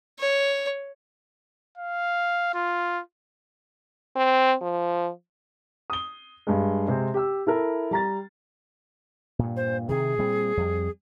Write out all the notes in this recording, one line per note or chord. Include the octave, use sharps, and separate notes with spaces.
C#5
F5
F4
C4
F3
D#6 G7
G2 G#3
C3 G#3 C4
G4 E6
E4 A4 A#4
G3 A#5 A6
G2 A#2
C5
C3 D#3 G#4
A#2 G3 C4
F2 G3